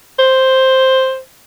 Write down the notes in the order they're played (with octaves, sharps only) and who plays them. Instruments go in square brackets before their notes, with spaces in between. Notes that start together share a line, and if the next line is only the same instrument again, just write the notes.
[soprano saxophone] C5